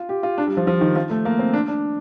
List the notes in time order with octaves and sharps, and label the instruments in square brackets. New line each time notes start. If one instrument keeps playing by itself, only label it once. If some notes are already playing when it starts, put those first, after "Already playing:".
Already playing: [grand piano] F4
G4
F4
D4
G3
F3
F3
D#3
F3
A3
A#3
C4
D4
D4